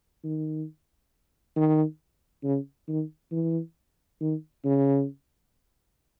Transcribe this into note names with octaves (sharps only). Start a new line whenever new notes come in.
D#3
D#3
C#3
D#3
E3
D#3
C#3